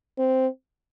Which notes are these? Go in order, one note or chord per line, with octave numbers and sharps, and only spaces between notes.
C4